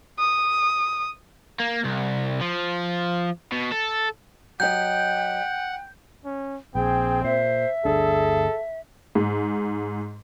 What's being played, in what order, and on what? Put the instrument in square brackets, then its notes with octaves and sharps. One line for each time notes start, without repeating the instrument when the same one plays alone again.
[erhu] D#6
[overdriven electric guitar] A#3
C2
F3
B2
A4
[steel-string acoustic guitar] F#3 D#5 [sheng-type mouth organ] F#5 [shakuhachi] G5 [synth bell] G6
[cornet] C#4
[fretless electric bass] A#1 [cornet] C4 [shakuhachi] G#4 [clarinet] G5
[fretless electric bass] A#2 [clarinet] C5 [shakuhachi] E5
[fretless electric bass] G1 D2 D4 [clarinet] G#4 [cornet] A4
[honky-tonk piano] G#2